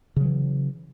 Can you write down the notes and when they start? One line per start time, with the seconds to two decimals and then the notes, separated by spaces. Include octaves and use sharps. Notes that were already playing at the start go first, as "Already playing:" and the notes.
0.16 C#3
0.21 F#3
0.25 E3